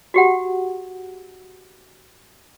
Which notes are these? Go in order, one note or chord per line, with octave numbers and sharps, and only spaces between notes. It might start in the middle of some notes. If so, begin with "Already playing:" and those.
F#4 G4 F#5